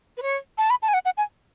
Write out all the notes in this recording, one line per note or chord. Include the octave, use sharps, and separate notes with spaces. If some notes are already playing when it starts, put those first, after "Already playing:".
B4
C#5
A5
B5
A5
G#5
F#5
F#5
G#5